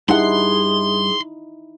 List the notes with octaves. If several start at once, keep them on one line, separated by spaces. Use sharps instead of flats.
G2 D#4 E4 G#4 F#5 C6